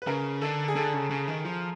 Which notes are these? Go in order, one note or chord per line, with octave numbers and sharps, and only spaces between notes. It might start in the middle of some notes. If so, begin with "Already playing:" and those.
B4
C#3 A#4
D3 A4
G#4
D3 A4
C#3
C#3
D#3
F3